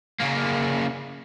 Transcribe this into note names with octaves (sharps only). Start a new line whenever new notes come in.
C#3 A#3